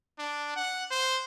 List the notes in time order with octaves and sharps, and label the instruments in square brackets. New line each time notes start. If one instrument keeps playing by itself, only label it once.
[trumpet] D4
F#5
C5